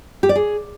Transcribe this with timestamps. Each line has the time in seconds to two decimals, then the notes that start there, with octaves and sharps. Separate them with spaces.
0.23 G4
0.29 D5
0.36 G#4